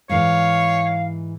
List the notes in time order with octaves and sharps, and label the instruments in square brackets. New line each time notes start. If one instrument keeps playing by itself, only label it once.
[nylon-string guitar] G#2 E3 [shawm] C#5 [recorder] F5